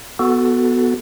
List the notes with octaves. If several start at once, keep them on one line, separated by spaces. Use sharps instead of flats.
B3 F#4 A4